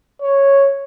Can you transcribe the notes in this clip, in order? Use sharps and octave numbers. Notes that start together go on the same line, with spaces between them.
C#5